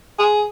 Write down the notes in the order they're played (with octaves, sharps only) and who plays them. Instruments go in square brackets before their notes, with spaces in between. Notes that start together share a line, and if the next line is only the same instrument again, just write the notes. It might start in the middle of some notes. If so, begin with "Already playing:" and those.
[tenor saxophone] G#4